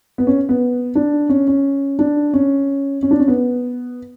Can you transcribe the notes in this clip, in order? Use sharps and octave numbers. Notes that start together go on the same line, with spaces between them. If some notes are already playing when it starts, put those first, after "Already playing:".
B3
C#4
B3
D4
C#4
C#4
D4
C#4
C#4
D4
C#4
B3